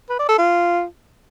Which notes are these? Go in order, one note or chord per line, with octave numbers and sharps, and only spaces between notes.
B4
D5
A4
F4